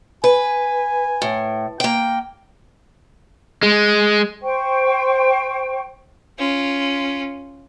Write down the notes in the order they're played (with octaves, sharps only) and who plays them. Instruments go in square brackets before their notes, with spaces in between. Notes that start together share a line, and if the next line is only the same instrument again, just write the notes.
[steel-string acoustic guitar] B4 [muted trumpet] G#5
[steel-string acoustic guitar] A2
A#3 G5
[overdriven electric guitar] G#3
[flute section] C5 G5 C#6
[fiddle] C#4 F4